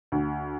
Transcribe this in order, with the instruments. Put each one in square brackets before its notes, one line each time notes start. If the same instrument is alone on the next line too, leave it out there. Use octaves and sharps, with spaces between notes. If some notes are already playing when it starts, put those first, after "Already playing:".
[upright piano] D2